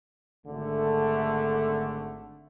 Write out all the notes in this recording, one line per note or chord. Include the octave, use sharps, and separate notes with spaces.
G#1 D3 A3